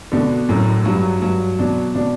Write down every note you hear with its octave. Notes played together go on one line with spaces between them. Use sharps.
B2 D3
F#2 A2
G2 F#3
G2 F#3
B2 D4
B2 D4